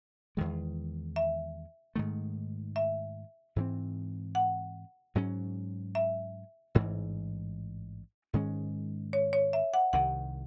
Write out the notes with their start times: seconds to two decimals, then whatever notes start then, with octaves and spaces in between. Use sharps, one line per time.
0.37 E2 D#3 G#3
1.16 E5
1.96 G#2 D#3 A3
2.76 E5
3.56 G#2 E3 C4
4.35 F#5
5.15 G#2 F#3 C#4
5.95 E5
6.75 A1 G#2 E3
8.33 G#2 D#3 G#3 C#4
9.13 C#5
9.33 C#5
9.53 E5
9.74 F#5
9.93 C2 C3 D#3 F#5